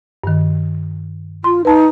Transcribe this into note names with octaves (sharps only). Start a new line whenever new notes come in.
G2 D#3
F4 C6
D#4 B4 A5